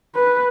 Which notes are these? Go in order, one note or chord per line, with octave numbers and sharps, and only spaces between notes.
B4